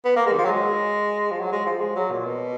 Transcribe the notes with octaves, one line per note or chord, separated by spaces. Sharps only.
B3
A#3
G#3
D#3
F3
F#3
G#3
F3
F#3
G#3
F3
G#3
F#3
A#2
B2